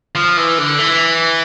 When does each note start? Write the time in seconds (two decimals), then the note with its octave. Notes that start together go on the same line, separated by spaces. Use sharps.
0.15 F3
0.37 E3
0.58 D3
0.78 E3